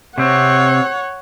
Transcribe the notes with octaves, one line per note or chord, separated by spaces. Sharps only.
C3 C4 C#5 F#5